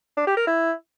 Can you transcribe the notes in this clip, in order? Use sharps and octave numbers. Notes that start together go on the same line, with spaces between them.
D4
G4
A#4
E4